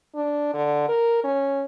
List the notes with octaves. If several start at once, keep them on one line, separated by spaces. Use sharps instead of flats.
D4
D3
A#4
C#4